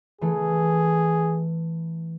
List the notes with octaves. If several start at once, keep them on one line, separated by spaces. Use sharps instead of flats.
E3 A3 G#4